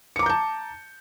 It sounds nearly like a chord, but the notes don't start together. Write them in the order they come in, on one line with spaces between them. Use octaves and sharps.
C#7 D6 A#5 G6 A5